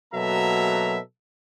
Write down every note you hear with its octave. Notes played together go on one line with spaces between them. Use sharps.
B2 F#3 A#3 A4 E5 A#5